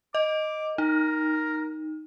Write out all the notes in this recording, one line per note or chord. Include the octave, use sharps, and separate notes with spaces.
D#5 D6
D#4 A#4